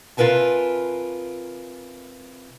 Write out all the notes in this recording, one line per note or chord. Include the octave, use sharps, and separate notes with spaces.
C3 F4 A#4 B4 G#5 A5